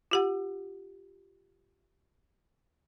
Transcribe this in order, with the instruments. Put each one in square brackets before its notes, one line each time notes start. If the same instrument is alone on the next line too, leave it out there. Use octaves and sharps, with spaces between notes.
[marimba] F4 G4 F#5